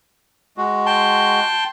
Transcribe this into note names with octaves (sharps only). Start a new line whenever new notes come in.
G#3 F#4
G5 A5 C6